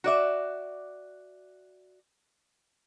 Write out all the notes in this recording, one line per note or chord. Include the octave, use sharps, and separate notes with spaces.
F#4 D5 E5